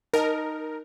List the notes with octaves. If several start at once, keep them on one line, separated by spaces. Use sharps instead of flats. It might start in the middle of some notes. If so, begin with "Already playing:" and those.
D#4 A#4 D#5 A5